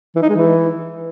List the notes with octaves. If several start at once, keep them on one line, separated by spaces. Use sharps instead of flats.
E3
D#4
G#3
E3